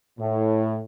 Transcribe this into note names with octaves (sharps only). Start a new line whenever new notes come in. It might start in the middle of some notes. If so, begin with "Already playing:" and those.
A2